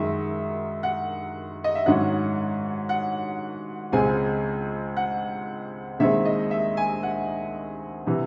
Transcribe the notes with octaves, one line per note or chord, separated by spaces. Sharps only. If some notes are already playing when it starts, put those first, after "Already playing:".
Already playing: F#2 D#3 G#3 E5
F#5
D#5
E5
G#2 D#3 F#3 C#4 F#5
F#5
C#2 C#3 G#3 C4 G#5
F#5
D#2 D#3 G#3 C4 E5
D#5
E5
G#5
F#5
C3 E3